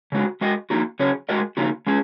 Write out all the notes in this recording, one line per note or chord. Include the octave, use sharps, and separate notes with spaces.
C#3 G#3 F#4
G#3 F#4 D#5
A#3 D#4 F#4
C#3 F#3 C#4 G#4 C#5
G#3 F#4 A#4 D#5
C#3 A#3 D#4 F#4
G#3 C#4 G#4